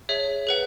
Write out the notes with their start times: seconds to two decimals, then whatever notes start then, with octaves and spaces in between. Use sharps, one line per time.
0.09 G#4 C#5 E5
0.47 G#4 B4 F#5